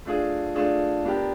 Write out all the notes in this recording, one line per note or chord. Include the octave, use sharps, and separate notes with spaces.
A3 D4 F4 G#4
A3 D4 F4 G#4
B3 D4 G4 A#4